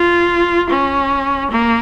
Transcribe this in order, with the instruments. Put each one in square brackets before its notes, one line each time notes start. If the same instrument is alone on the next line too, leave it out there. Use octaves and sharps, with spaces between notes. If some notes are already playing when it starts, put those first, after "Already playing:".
Already playing: [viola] F4
C#4
A#3